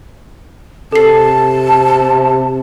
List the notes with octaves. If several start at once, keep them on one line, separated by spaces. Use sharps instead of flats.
C3 A4 A5 C7